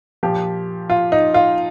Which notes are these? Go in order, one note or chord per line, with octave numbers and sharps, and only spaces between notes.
A#2 F3 G4
F4
D#4
F4